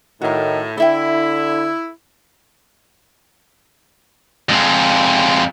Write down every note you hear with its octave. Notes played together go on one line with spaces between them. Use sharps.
A2 D#3 F#4 A#4
D3 E4 A4 E5 G5
F2 G#3